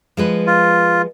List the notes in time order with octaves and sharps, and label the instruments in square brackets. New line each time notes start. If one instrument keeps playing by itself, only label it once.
[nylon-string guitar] F3 G#3 B4
[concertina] F4